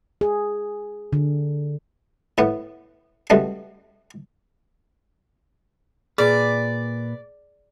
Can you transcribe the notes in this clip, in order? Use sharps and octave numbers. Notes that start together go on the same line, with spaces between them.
G#4
D3
A2 B3
C#2 B2 G3 A3
A#2 G#4 B4 D5